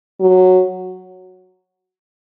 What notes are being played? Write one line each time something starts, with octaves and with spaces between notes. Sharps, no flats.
F#3